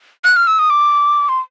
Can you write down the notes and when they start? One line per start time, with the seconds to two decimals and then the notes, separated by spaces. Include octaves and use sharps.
0.24 F#6
0.36 F6
0.47 E6
0.59 D#6
0.70 D6
1.29 C6